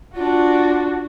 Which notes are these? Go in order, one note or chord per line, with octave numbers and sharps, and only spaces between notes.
D4 F4 F#4